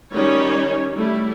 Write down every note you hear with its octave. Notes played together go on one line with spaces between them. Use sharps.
D#3 G3 C#4 D#4 C#5
G3 A3 E4